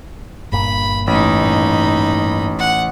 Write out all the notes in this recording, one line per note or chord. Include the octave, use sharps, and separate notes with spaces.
G1 G2 A#2 B5
A1 D#4 B5
G2 A#2
F#5